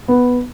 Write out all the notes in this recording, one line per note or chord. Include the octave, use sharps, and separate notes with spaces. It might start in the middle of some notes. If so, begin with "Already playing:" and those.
B3